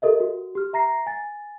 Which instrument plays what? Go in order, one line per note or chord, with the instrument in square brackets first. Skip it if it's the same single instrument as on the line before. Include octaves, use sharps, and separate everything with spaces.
[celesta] G4 A4 A#4 D#5 E5
F#4
G4 F6
E5 A#5 A#6 C7
G#5 A6